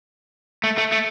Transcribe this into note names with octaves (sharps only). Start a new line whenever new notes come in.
A3
A3
A3